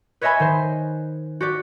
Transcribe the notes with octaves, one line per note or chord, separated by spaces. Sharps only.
B4 C#5 D#5 E5 G#5 B5
D#3 C5
F#4 G4 D5